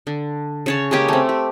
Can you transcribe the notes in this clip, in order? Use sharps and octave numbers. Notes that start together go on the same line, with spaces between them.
D3
C#3 C#5 A5
G#3 A#3 C#4 G4
A3 C4
G4